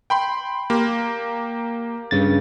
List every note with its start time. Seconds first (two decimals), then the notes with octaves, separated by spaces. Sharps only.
0.10 G5 B5 C6
0.70 A#3 G4
2.11 G2 C#3 A6